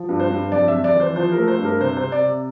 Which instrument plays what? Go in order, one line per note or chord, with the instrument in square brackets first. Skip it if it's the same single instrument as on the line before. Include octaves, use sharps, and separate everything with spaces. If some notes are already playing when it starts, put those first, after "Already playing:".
Already playing: [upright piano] F3
G2
C5
G2
F2 D5
F2 E5
D5
E3
C5
F3 C5
A#4
A3
C5
G2
A#4
C3 C5
C5
C3
D5
C3